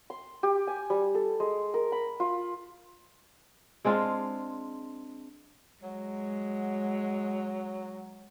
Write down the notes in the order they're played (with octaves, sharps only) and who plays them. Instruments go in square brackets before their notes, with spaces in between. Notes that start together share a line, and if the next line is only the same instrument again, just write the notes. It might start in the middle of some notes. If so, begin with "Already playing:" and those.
[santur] C6
G4
G#5
G3
A4
G#3
A#4
B5
F4
[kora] G#3 C4 D4 F4
[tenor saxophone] F#3 [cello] G#3